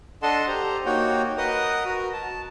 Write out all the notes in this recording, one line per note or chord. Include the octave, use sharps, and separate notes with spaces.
D4 A4 D#5 F#5 A5 C6
G4 C5 A#5
A#3 D#4 F#4 C#5 F#5 G5
A#4 B4 D#5 F#5 D#6
F#4 A#4
A5